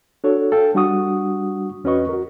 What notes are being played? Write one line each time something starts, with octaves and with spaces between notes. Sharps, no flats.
D4 F#4 A4 C#5
A4 F5 G5
G3 D4 F#4 F#5 C#6 D#6
E2 C#4 F#4 B4 D#5 C#6
F#4 A#4